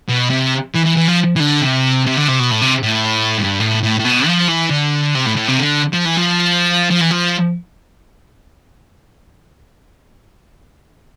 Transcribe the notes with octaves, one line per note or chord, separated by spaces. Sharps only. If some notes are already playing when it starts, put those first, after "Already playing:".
B2
C3
E3
E3
E3
F3
E3
D3
C3
C3
D3
C3
B2
A2
C3
A2
G2
A2
A2
A2
B2
F3
E3
D3
C3
A2
A2
C3
D3
F3
E3
F3
F3
E3
F3